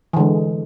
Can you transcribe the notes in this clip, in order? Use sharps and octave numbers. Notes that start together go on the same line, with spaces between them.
D3 E3 G#3